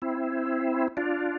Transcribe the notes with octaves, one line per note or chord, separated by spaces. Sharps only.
C4 E4
D4 F4